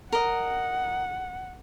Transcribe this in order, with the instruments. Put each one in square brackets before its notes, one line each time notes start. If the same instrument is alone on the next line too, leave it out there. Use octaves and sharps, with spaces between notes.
[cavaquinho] A#4 D#5 [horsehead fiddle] F#5